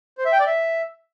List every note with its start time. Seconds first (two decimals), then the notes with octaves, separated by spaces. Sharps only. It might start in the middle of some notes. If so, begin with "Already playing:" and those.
0.18 C5
0.25 E5
0.32 G5
0.39 D5
0.47 E5